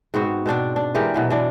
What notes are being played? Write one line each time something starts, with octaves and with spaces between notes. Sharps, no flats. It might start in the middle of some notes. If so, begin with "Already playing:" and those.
G#2 B3 C4 F#4
B2 C4 D4 D5
D4
E3 G#3 G4 A#4
B2 E3 F#3
E3 D4 D5